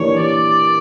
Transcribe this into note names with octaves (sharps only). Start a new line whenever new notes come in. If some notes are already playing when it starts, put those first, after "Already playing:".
Already playing: E3 A#3 D4 G4 C#5
D5